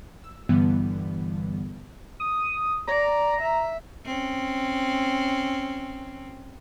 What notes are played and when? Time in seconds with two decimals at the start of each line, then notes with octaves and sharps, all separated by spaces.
0.24 E6
0.49 G2 D3 E3 G3 B3
2.20 D#6
2.87 D5 A#5
3.41 E5
4.05 C4 C#4